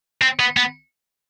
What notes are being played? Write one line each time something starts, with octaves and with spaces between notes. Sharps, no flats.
C4
B3
B3